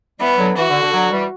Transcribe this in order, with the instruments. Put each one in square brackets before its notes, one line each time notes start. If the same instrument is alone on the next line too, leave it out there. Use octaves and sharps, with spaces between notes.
[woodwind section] E3 G3 [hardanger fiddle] B3
[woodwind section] D3 F#3
[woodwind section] E3 [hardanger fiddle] F#4
[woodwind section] D3
D3
D3 F#3
E3 G3